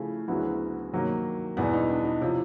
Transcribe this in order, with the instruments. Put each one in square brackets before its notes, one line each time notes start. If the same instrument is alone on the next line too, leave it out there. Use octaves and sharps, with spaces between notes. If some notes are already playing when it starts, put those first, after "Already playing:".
Already playing: [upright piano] C#3 F3 A3 [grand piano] E4
[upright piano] D2 C#3 F#3 B3 E4 [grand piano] F#4
[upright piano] C3 D#3 F#3 A#3
[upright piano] E2 B2 G3 B3 [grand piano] E4
[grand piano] D#4
D4
D#4
[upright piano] C3 F3 [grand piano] E4